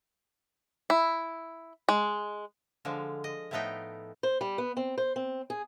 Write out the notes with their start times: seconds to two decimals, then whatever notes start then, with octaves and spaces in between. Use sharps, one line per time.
0.90 E4
1.89 G#3
2.85 D3 F3 G#3
3.24 D#5
3.51 A2 F3 A3 B3 D#4 G5
4.23 C5
4.41 G3
4.58 B3
4.77 C4
4.98 C5
5.16 C4
5.50 G#4